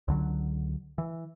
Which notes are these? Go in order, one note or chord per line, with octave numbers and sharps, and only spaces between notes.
C#2 D3 F#3
E3